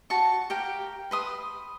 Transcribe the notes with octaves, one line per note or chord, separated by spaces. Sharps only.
F#4 A5 C#6
G4 A#4 F5 G5
B4 C6 D#6